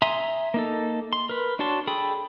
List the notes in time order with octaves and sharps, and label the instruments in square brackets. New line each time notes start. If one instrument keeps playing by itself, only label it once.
[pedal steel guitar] E5 G#5 A#5 C6 D#6
A#3 D#4 A4
C6
A#4 B4
D4 F#4 C#5 A5 C6
G#4 A4 G5 B5 D#6